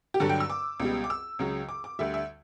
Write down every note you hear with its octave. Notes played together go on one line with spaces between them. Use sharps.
G4
G2 D3 F#3 A4
G5
E6
D6
C#2 B2 G3
D6
E6
C#2 C#3 F#3
D6
D6
D2 D3 G3 E5
E5